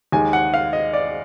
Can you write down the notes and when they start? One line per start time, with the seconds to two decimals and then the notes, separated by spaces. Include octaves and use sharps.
0.12 D#2 D#3 G#3 G#5
0.33 F#5
0.54 F5
0.73 D#5
0.93 D5